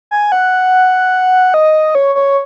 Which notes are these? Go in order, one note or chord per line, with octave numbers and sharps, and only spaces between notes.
G#5
F#5
D#5
C#5
C#5